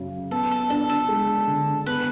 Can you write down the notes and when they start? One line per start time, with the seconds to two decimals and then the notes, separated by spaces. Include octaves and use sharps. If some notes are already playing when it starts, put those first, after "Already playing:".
Already playing: F#2 C#3
0.31 B3 A4
0.51 A4
0.70 D4 A4
0.89 A4
1.09 G#3
1.47 D3
1.86 B3 B4